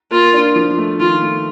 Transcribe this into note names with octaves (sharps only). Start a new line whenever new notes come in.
A#3 F4
D4
F3
A3
D#3 F4
A3